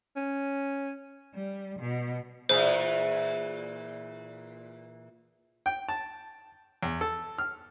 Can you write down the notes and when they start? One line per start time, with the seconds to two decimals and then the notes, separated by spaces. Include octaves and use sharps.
0.17 C#4
1.34 G3
1.80 B2
2.49 A#2 E3 G#4 C5
5.66 G5
5.89 A5
6.83 E2
7.01 A4
7.38 F6